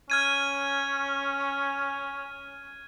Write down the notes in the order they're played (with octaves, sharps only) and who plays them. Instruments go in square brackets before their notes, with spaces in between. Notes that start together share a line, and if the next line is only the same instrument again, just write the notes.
[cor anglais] C#4 [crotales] F6 G#6 D#7